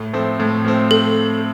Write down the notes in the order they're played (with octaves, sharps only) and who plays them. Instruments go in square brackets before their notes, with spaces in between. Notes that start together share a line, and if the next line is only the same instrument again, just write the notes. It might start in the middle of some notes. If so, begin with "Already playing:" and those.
Already playing: [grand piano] A2
F3 A3 C4
A2
F3 A3 C4
[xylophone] A4